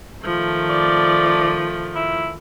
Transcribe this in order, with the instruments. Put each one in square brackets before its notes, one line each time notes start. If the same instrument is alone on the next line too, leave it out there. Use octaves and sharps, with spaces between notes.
[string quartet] D#3 F3 A3
[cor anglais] D5
E4